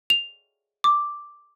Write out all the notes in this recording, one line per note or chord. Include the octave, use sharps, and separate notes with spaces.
F7
D6